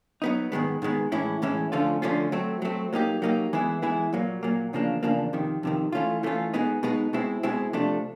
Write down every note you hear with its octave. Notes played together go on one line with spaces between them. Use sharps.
F#3 B3 D#4
G#2 D#3 G#3 B3
G#2 D#3 G#3 B3
A2 E3 G#3 C#4 E4
A2 E3 G#3 C#4 E4
D3 F3 A3 C#4 F4
D3 F3 A3 C#4 F4
F#3 A3 C4
F#3 A3 C4
F#3 A#3 D#4 G4
F#3 A#3 D#4 G4
E3 G#3 B3 E4 G#4
E3 G#3 B3 E4 G#4
A#2 F#3 A#3
A#2 F#3 A#3
E2 C#3 F3 A#3 D4
E2 C#3 F3 A#3 D4
F2 C3 D#3
F2 C3 D#3
E3 A3 C#4 F4
E3 A3 C#4 F4
B2 G#3 B3 D#4
B2 G#3 B3 D#4
B2 G#3 C4 E4
B2 G#3 C4 E4
C3 F3 A3 D4